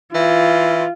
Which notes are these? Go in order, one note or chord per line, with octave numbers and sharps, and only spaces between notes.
E3 F4